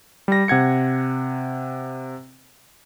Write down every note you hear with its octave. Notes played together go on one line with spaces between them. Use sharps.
G3 A#6
C3 F#5 G#6 C#7